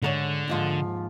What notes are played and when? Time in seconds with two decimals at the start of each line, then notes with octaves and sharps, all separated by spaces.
0.02 G#2 D3 A#4 C#5
0.48 D#2 G#2 F3